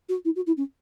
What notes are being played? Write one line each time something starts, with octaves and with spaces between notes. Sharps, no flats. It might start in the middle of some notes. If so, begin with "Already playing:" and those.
F#4
E4
F#4
E4
C#4